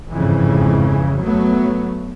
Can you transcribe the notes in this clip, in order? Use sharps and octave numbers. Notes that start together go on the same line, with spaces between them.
G1 F2 G#2 C#3 E3
F#3 A3 B3